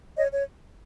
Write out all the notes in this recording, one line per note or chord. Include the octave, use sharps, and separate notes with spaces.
C#5 D#5
C#5